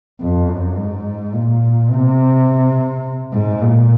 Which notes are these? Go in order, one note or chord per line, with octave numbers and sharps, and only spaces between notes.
F2
F#2
G#2
A#2
C3
G#2
A#2